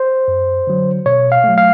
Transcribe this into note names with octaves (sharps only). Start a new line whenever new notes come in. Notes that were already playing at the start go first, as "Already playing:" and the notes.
Already playing: C5
F#2
D3 F#3
B2 C#5
F5
F#3 A3
F5